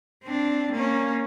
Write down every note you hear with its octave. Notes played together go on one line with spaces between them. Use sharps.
C4 D4
A#3 C#4